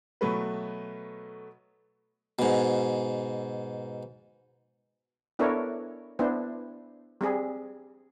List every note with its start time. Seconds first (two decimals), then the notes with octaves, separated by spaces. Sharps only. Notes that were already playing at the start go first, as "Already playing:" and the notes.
0.21 B2 F#3 A3 B4
2.39 G#2 B2
5.39 B3 D4 E4 A4 A#4 C#5
6.19 B3 D4 E4 C5
7.21 G3 C4 G#4